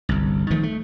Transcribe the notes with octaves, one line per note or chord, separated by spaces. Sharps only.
G1 C2
D#3 F3 A3
A3